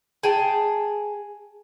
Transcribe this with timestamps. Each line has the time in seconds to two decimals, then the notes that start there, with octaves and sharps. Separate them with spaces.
0.23 G#4 G5 A5